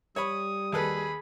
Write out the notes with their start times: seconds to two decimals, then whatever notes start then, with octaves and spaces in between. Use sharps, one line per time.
0.16 G3 C#5 B5 D#6
0.72 D#2 G#4 A4 B4 B5